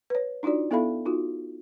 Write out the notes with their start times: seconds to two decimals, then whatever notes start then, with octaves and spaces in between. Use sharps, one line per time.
0.10 B4 C#5
0.43 D4 D#4 F4 F#4 D5
0.71 B3 E4 A4 E5 F5 B5
1.05 D#4 F4 F#4